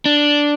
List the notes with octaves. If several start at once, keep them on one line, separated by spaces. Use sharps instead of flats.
D4